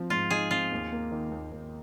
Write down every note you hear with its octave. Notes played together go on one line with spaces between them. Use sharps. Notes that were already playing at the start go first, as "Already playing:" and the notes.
Already playing: F3 C4
G#2 F4
D#4 G#4
C4 F4
D#2
A#3
D#3
D#2
D#2